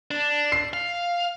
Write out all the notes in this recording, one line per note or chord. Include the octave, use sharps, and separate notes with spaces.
D4
C7
F5